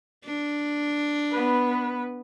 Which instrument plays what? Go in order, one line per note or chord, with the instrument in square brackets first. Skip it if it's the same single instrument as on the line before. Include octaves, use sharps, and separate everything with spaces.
[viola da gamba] D4
[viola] B3 B4